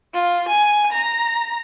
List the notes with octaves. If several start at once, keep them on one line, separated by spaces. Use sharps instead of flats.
F4
G#5
A#5